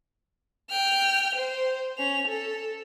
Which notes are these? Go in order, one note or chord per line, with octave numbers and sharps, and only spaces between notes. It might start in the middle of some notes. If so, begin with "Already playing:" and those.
G5 F6
C5
C#4 F7
A4